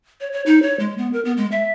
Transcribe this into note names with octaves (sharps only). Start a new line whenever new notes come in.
C#5
C#5
D#4
C#5
G#3
B3
A#4
B3
G#3
E5